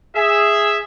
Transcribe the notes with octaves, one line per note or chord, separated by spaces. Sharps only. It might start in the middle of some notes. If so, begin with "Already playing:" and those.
G#4 E5